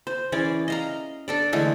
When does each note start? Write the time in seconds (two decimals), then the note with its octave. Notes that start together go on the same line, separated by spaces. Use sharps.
0.07 C5
0.32 E3 C#4 G#4 D5
0.68 D#5 F5 A#5
1.28 D4 A4 D5
1.53 D3 E3 G#3 A3